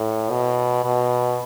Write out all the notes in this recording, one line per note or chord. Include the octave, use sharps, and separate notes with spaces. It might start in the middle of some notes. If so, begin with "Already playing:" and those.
Already playing: A2
B2
B2